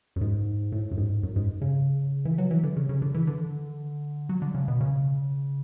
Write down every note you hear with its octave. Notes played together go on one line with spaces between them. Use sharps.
F#2
G#2
A2
F#2
G#2
F#2
G#2
C#3
E3
F#3
E3
D3
C#3
C#3
D3
E3
D3
F#3
D3
C#3
B2
C#3